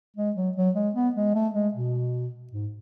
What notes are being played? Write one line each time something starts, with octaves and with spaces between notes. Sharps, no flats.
G#3
F#3
F#3
G#3
B3
G#3
A3
G#3
B2
G#2